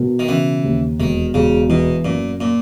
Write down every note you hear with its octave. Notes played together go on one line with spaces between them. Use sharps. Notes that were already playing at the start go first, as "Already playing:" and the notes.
Already playing: B2 A#4
D#3
C#3 E3
D#2
E1 D#3
E1 C#3
B2 E3
F#2 A#2
A#2